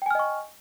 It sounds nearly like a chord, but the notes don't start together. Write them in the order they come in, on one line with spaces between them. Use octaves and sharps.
G5 G#5 F6 D#5 C#6